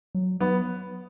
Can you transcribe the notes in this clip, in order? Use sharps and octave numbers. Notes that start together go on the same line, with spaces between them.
F#3
F#3 B3